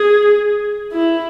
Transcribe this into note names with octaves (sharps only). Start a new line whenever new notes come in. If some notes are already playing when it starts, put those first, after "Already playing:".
Already playing: G#4
E4